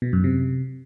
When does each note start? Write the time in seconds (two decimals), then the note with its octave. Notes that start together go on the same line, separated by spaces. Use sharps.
0.02 B2
0.13 F#2
0.24 C3